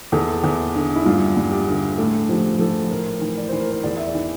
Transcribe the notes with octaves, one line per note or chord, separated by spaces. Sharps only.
E2 A4
E2
D3
E4
G2 F4
G2
G4
D3
A2 A4
F3 G4
F3 A4
A2 A#4
E3
D5
E3 C5
A#4
C5
E2 D5
E5
D5
E3